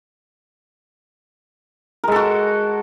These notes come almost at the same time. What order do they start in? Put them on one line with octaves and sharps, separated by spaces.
A#4 G#3 A4 F#4